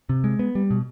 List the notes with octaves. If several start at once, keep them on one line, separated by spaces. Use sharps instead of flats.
C3
G#3
B3
G3
B2